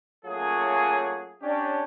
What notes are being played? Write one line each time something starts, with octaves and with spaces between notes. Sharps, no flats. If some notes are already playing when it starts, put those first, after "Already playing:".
F#3 A3 A#3 C#4 F4 G#4
C#4 D4 G4